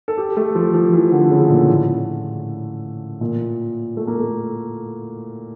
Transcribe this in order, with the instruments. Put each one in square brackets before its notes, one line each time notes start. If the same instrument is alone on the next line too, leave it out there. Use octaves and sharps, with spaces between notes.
[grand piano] A4
G4
A3
F3
F3
E3
D3
C#3
A#2
A2
A#2
A3
A#3
A3